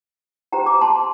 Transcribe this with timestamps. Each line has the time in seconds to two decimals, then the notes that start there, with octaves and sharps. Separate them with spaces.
0.52 D#4 G4 C5 G5 A#5
0.66 A#5 D6
0.81 A5 C6